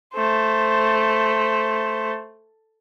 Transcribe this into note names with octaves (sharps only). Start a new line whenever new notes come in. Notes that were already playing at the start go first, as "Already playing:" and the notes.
A3 C5